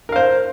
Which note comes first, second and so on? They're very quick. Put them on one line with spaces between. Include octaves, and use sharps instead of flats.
A#4 F5 C5